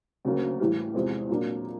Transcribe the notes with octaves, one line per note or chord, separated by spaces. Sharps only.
D2 C#3 F#3 A#3
A2 E3 G3
E2 C3 F3 G#3 C4
A#2 F#3 A#3 D4